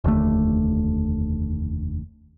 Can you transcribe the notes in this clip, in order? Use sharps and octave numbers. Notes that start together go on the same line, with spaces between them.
F1 D#2 D3 A3